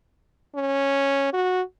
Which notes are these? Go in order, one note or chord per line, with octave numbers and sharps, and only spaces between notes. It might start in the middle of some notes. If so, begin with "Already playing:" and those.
C#4
F#4